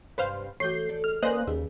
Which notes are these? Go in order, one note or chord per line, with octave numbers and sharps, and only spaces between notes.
G2 C3 F#3 B4 C5 F5
E3 A3 F#4 G6 C7
A4 D5
A#2 G#3 F6
A#3 C#4 B4 C5 D5 D#5 G#5 F#6
D#2 C#3 G#4